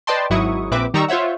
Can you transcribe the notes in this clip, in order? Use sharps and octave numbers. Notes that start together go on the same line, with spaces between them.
B4 D5 D#5 G5 A5 C6
G#1 G#2 F#3 E4 C#6 D#6
A#1 C4 B4 E5 D6
D#3 G3 D#4 A#5 C#6 E6
F4 C5 C#5 E5 F#5